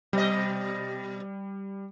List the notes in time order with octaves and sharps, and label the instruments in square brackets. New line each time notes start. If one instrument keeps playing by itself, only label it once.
[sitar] B2 D#5 [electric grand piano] G3